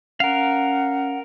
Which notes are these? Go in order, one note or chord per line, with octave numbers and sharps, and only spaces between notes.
C#4 A#4 F5 F#5